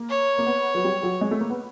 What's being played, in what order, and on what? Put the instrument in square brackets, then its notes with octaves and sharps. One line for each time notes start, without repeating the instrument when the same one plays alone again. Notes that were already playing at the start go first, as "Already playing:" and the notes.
Already playing: [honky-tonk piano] A#3
[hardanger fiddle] C#5
[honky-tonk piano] A#3
B3
F#3
G3
F#3
G#3
A3
A#3
B3